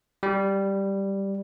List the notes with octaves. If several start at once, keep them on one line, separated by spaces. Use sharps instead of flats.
G3